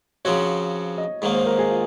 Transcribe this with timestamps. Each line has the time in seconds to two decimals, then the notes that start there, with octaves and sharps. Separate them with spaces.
0.25 C#3 F3 C4 F#4 C#5
0.98 D#5
1.22 G#2 D#3 A#3 C#5
1.34 C5
1.46 A#4
1.59 G#4
1.71 F4